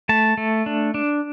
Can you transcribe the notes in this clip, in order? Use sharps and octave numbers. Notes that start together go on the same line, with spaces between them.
A3 A5
A3
D4
D4